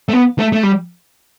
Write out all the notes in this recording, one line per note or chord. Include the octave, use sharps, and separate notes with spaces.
A3
B3
A3
A3
G3